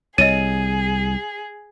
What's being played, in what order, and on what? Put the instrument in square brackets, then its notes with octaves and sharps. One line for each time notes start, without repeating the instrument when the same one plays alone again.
[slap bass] C2 [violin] G#4 [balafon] C#5 D#5 [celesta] D#7